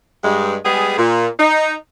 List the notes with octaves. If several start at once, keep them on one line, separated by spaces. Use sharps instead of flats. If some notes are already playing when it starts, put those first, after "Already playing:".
G2 G#3
G3 G#3 B3 G#4
A#2
D#4